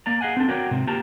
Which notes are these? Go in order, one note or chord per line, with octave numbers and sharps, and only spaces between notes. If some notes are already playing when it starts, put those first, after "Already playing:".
A#3 D5 A#5
G#4 D#5 F5 F#5 G#5
C4 D4 A4
F#4 A#4 C#5 D5 G5
G#2 C3 C4
A#3 F4 G4 C5 A5 A#5